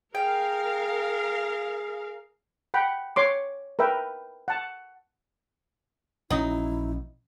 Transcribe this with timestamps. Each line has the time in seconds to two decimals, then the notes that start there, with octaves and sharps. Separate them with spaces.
0.15 G#4 A#4 F5 G5
2.74 F#5 G5 B5
3.16 C#5 C6 D6
3.79 A#4 B4 E5 G5
4.48 F#5 A5
6.30 A#1 F#3 C#4 D#4 E4